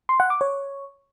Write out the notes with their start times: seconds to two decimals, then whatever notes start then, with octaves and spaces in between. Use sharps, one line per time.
0.09 C6
0.20 F#5
0.30 D6
0.41 C#5